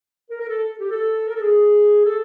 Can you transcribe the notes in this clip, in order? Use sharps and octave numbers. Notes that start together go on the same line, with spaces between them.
A#4
A#4
A4
G4
A4
A#4
A4
G#4
A4